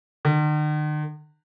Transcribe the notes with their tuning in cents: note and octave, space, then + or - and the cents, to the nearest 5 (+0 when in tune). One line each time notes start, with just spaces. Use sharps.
D#3 -45